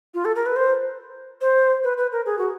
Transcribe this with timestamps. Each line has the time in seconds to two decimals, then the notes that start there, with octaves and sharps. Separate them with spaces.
0.14 F4
0.25 A4
0.36 A#4
0.46 B4
0.56 C5
1.41 C5
1.84 B4
1.97 B4
2.12 A#4
2.26 G#4
2.39 F#4